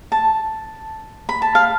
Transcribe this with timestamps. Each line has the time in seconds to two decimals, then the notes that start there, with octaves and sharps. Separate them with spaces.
0.12 A5
1.29 B5
1.42 A5
1.55 F5